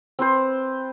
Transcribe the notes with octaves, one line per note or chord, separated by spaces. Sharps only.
C4 B4 C5